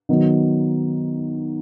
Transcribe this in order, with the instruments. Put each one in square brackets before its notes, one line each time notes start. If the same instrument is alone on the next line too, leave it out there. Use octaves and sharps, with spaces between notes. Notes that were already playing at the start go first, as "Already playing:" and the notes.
[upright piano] D#3 F#3 B3